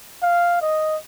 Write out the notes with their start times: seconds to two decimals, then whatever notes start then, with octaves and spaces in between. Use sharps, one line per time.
0.22 F5
0.62 D#5